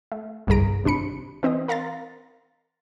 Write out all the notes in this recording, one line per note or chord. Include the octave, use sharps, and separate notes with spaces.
A3
G1 C2 G2 G#4 A#5 D7
G#1 C3 D4 B5 C#7
E3 C4 D#5 D#6
A#4 F5 A#5 C6 A6